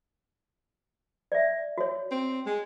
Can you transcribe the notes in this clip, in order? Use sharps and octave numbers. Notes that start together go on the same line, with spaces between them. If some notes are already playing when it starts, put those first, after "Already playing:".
D5 E5
F#4 C#5
C4
G#3